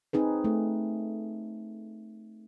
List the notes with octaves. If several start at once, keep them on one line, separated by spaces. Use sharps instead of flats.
C4 D#4 G#4 B4
A3